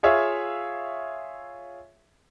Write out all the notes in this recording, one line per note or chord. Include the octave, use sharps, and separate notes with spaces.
F4 G#4 C#5 E5 F5